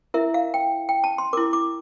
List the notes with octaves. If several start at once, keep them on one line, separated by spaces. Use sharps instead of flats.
E4 A#4 E5
F5
G5
G5
A5
C6
E4 A#4 D6
D6